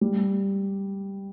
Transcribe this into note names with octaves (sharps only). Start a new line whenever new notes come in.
G3